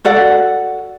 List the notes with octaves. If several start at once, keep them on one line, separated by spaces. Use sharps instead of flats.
F#4 A4 D5 F#5